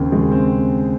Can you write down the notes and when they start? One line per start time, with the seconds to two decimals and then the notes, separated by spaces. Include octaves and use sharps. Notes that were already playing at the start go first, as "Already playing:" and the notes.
Already playing: D#2 C#3 C4
0.12 G#3
0.32 C4